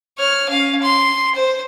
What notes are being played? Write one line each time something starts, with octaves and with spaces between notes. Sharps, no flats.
C#5 F6
C#4 F5
C6
C5